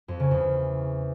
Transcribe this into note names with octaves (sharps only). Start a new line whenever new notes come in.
F2
C#3
E2